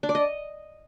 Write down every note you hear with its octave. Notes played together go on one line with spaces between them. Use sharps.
D4
D5
D#5